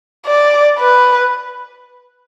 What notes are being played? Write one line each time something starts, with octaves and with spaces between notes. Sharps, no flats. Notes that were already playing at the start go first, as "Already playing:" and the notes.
D5
B4